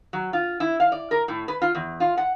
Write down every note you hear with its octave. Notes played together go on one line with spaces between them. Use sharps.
F#3
F4
E4
F5
D5
A#4
A2
B4
F4
E2
F4
F#5